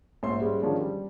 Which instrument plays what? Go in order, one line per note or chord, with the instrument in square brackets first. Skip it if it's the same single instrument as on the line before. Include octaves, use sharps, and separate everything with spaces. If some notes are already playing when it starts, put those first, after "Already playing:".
[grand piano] A#1 G#2 C#5 E5 C6
G3 G#3 C#4
D3 D#3 F3 G#3 C#4 D4
G3